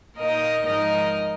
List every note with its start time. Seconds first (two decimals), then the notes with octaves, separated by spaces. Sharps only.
0.18 A#2 A#3 D#4 A#4 D#5
0.66 G#2 F3 G#3 D#4 A#4 D#5